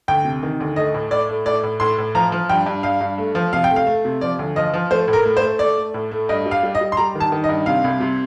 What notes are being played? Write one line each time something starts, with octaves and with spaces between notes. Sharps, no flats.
D2 G5
C3
D#3
D2
A3 D#5
A2
A2 D5
A3
A2 D5
A2
A2 C6
A2
F3 A#5
F3
G2 G5
G2
G2 F5
G2
A3
F3
C3 F5
G5
A3
F5
A3
C3
F3 D5
D2
F3 D#5
F3
A3 C5
A2
A#4
A3
C5
A3
A3 D5
A3
A2
A3
G2 D#5
G3
F5
G3
D#5
G3
C6
G3 A#5
D#3
A5
D#3
D#5
G2
C3 F5
C2
C3